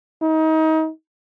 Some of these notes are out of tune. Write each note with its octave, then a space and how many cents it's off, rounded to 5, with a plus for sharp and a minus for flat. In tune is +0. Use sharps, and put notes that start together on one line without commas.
D#4 +30